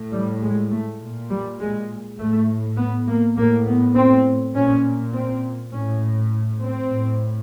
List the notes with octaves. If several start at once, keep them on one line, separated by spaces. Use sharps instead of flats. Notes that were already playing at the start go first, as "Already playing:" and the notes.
Already playing: A2
G3
G#3
A3
A#2
G3
G#3
A2 A3
B3
A#3
A2 A#3
B3
C4
A#2 C#4
C4
A2 C#4
C4
A2